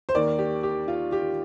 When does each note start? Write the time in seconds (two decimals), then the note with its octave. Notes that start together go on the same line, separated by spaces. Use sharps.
0.09 C5
0.15 D#2 D#3 A#3 D5
0.38 G4
0.63 G4
0.88 F4
1.12 G4